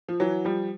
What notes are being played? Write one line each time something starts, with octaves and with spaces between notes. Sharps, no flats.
F3
E3 F#3
F3 G3